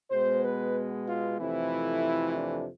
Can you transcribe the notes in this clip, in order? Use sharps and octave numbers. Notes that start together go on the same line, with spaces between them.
B2 G#3 B3 C5
B4
F4
F2 C3 E3 A3 E4
D4